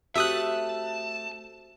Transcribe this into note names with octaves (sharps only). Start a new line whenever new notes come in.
A3 C4 F#4 G4 E5 A5 D#6 F#6